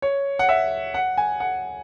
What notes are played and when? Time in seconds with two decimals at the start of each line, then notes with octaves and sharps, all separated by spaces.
0.02 C#5
0.39 F#5
0.49 E5
0.94 F#5
1.18 G#5
1.40 F#5